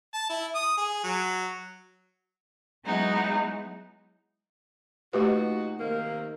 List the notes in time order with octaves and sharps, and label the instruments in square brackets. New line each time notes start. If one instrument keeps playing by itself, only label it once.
[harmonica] A5
E4
D#6
G#4
F#3
[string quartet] F#3 G#3 B3 D#4 E4
[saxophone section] A#2 D#4 F#4 [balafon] A3 G4 B4
[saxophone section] C3 D#3 A#3